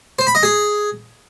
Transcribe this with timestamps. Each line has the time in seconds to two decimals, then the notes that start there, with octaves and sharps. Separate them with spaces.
0.19 C5
0.27 B5
0.35 D#5
0.43 G#4